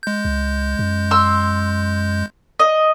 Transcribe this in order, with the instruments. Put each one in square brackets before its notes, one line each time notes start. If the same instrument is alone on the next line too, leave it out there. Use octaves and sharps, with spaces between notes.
[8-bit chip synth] G#3 G6
[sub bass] C#2
F#2
[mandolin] C6 E6
D#5